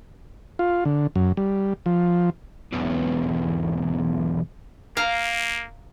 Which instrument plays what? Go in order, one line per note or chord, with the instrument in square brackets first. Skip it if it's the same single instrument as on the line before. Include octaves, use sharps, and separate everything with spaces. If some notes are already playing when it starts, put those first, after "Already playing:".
[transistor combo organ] F4
D3
F#2
G3
F3
[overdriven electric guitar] B1 E2
[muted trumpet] A#3 [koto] F5 A#5